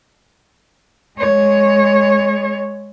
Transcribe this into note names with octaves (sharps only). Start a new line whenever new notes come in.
G#3 C#5